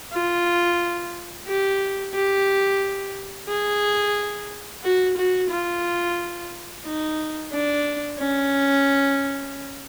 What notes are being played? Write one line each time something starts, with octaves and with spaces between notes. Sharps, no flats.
F4
G4
G4
G#4
F#4
F#4
F4
D#4
D4
C#4